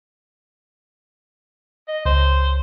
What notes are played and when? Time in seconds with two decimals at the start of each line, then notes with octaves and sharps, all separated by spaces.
1.88 D#5
2.06 C#2 C5